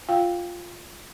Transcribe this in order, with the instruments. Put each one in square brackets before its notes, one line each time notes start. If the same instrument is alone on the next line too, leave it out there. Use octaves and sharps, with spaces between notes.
[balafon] F4 F5 G5